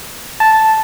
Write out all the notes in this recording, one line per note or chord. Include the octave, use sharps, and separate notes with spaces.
A5